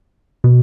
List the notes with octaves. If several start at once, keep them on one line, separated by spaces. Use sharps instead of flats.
B2